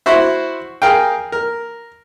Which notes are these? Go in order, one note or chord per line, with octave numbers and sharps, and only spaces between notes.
E4 F#4 C5 E5
G#4 A#4 F5 G5
A#4